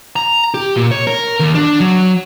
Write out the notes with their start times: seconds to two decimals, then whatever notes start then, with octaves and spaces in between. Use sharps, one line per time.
0.16 A#5
0.54 G4
0.76 A#2
0.91 C#5
1.07 A#4
1.40 D#2
1.55 D4
1.80 F#3